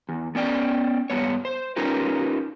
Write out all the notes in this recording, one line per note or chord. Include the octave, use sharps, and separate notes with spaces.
E2
B3 C#4 D5 G5
G2 B3 C#5
C5
C#4 D#4 F4 G4 A#4 B4